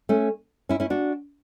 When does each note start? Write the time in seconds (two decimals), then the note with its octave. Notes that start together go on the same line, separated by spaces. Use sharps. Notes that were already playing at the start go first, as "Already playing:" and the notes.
0.09 A3 C#4
0.69 C#4 E4
0.80 C#4 E4
0.90 D4 F#4